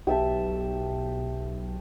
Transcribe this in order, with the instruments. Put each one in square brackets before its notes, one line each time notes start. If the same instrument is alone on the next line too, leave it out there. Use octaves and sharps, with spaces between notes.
[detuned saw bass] B1 [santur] G4 E5 A5